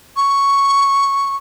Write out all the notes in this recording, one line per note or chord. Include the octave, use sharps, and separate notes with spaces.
C#6